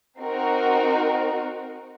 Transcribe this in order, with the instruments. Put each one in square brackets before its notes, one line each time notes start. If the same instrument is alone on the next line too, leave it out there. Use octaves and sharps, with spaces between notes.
[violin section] C4 D#4 F#4 A#4